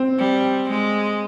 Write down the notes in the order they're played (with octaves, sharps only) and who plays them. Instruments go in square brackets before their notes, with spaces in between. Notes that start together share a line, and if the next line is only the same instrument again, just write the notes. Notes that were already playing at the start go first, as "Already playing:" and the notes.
Already playing: [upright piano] C4
[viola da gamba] G3
G#3